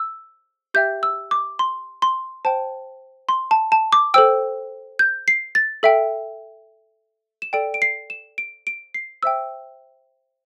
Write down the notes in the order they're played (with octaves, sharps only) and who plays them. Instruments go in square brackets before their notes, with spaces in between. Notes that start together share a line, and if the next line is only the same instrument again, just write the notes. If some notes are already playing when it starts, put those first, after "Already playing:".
Already playing: [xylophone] E6
G4 E5 G5 G6
E6
D6
C6
C6
C5 G5 A5
C6
A5
A5
D6
A4 C5 G5 E6
G6
C7
A6
A4 E5 G5
E7
A4 D5 G5 D7
D7
C7
E7
D7
D7
C7
C5 E5 G5 E6